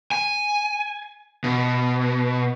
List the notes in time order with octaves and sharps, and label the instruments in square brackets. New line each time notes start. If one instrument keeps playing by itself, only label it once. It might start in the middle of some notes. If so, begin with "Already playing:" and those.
[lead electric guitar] G#5
B2